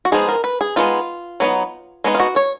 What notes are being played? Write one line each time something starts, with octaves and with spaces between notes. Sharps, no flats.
F#4
F3 G#3 B3 D#4 G#4
A#4
B4
G#4
G#3 B3 D#4 F4
F#3 B3 D#4
G#3 B3 D#4
F4
F#4
C#5